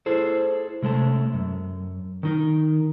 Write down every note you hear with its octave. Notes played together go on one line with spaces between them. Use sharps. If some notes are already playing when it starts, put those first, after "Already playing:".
E4 G#4 A4 C5
C3 G#3 A3 A5
F#2
D#3 D#4 A#4